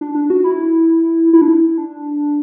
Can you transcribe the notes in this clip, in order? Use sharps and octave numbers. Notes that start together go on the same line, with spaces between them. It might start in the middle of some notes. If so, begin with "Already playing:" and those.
D4
D4
F#4
E4
E4
D4
E4
D4